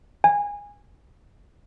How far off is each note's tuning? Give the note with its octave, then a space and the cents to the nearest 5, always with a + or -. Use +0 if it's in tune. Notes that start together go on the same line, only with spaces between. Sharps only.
G#5 -20